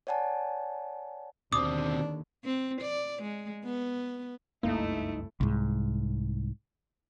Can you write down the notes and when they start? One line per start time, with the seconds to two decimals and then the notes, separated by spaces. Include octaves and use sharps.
0.07 C#5 D5 F#5 G#5 A5
1.53 D#2 B2 D3 C4 D4 D6 D#6
2.45 C4
2.81 D5
3.22 G#3
3.64 B3
4.63 F#1 C#2 G2 A3 A#3 D#4 E4
5.41 C2 G#2